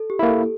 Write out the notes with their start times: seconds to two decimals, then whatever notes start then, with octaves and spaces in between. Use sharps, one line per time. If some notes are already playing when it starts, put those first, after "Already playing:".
Already playing: A4
0.10 G4
0.19 A#3 E4
0.28 A4